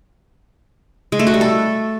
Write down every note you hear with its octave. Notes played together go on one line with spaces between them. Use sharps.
G#3
A3
F#4
G3
A4